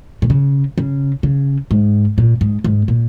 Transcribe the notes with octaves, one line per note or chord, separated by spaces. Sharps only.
A#2
C#3
C#3
C#3
G#2
A#2
G#2
G#2
A#2